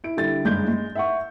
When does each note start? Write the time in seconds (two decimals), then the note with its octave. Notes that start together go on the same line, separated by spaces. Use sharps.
0.04 E4 D7
0.17 D3 G3 E4 A6
0.45 F#1 G2 G#3 D4 G6
0.68 G#3
0.95 E5 F#5 C#6